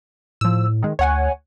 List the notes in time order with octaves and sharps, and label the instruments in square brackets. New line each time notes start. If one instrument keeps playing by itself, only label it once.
[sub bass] A2 [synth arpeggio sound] F3 E6
[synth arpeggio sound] D#3 G#3
[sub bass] D2 [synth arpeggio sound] C#5 F#5 G#5